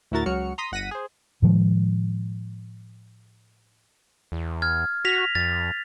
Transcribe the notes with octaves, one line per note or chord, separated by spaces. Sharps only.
D2 A2 E4 F#4 A#4 A6
C#2 F#3 F#4 F6 C#7
A#5 C6 D#6 B6
G1 F#5 A#6 B6 D#7
G#4 C5
A2 D#3 F3 G#3
E2
F6 G#6
F#4 A#6 B6 F7
F2 A6